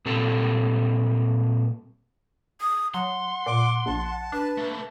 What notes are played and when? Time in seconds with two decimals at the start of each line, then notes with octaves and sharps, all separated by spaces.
0.05 A#2 G3 C4 A4
2.61 D#6
2.94 F#3 F#5 C6
3.46 A#2 D6
3.86 A#1 A5
4.32 D4 B4
4.58 A3 A#3